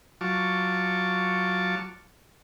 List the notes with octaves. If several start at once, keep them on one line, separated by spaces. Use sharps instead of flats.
F#3 F4 A5 C#6 D6